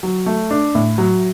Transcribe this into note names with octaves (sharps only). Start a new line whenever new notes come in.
F#3
A3
D4
A2
F#3